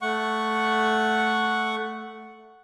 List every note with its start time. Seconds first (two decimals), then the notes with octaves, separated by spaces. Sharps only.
0.02 A3 F#5 C#6